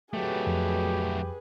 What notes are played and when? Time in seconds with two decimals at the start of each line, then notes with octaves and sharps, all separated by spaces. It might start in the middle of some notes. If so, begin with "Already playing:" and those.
0.13 F#3 A3 G4 G#4 B4
0.47 F2